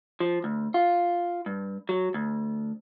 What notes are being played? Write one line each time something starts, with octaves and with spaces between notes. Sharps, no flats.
F3
D2
F4
G2
F#3
D2